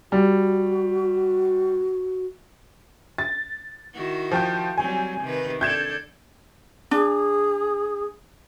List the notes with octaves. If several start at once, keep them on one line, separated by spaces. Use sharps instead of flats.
G3 F#4
A6
D#3 E4 F#4
F3 G5 G6
F#3 G3 C4 G#5
C3 D#3 B4
D4 A4 G6 G#6 E7
D4 G#4